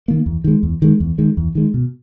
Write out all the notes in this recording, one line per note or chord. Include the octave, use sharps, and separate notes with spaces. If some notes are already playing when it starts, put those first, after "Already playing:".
D#3 A#3
E2
D#3 G#3
E2
D#3 G#3
E2
D#3 G#3
E2
D#3 G#3
B2